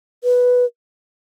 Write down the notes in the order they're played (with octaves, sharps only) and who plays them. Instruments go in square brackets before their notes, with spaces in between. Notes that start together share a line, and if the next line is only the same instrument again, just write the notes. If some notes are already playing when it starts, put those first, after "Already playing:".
[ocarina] B4